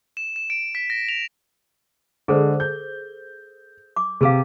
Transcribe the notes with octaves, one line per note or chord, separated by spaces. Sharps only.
E7
E7
D7
B6
A#6
F7
D3 G#3 G#4 A4 C5
G6
D6
C3 G#4 B4 F5 D6